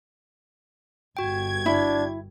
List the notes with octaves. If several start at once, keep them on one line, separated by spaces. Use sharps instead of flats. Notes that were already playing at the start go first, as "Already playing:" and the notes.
G1 F#4 G5 G#6
D4 E4